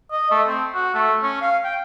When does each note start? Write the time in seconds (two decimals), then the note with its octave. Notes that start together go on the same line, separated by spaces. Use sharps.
0.11 D#5
0.31 A3
0.47 C4
0.75 F#4
0.94 A3
1.22 C#4
1.42 F5
1.64 G5